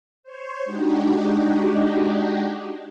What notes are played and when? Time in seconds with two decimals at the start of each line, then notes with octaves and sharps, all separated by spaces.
0.23 C5 C#5
0.65 G#3 D4 D#4 F#4 G4